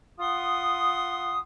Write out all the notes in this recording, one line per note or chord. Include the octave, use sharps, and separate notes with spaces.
F4 F#5 C6 D#6